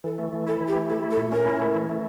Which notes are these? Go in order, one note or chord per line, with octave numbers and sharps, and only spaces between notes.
E3 A4
A3
E3
E4 A4
E3
G4
A3
E4 A4
A3
A4
A#2
C#4 A#4
E4
A3
E3
A3